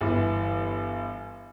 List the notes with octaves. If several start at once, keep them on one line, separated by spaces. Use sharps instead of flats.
G1 E3